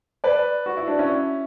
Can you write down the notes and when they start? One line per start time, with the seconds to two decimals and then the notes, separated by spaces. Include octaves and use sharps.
0.24 B4 D5
0.66 F#4
0.77 E4
0.87 D4
0.99 C#4 E4